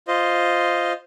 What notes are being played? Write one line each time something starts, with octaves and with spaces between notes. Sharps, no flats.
F4 C5 D#5